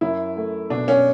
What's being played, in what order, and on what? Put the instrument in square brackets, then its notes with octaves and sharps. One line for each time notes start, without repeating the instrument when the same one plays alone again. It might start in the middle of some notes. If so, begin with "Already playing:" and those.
[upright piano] F#2 E4
A3
B2 D4
C#4